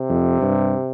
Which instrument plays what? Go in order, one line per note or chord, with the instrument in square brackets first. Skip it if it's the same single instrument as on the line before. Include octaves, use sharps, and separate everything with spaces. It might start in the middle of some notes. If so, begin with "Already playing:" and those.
Already playing: [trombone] C3
[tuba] F2
G2